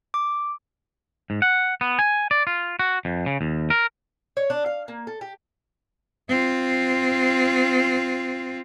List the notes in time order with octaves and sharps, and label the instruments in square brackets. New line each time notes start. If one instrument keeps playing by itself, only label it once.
[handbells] D6
[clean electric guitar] G#2
F#5
B3
G#5
D5
F4
F#4
F2
C#3
D#2
A#4
[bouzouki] C#5
D4
F5
A#3
A4
G4
[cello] C4 F4